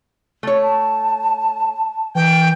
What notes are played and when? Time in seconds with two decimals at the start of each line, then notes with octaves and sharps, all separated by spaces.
0.43 A3 C#5
0.63 A5
2.15 E3 G5